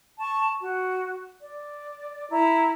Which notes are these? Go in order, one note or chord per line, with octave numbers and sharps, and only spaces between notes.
A5 C#6
F#4
D5
E4 A#5